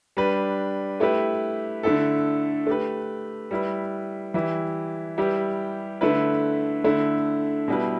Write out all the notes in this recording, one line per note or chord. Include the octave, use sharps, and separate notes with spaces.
G3 D4 B4
A3 E4 G4 B4
D3 A3 E4 A4
A3 G4 B4
G3 E4 B4
E3 G3 E4 G4
G3 E4 G4 B4
D3 A3 E4 B4
D3 A3 E4
B2 G3 E4 B4